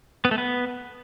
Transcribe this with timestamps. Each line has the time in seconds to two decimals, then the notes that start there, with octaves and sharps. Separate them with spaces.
0.25 B3
0.31 A3
0.38 B3